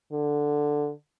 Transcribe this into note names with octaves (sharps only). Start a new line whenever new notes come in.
D3